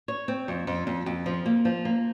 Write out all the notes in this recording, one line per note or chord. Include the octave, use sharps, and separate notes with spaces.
C#5
C4
F2
F2
F2
F2
F3
A#3
F3
A#3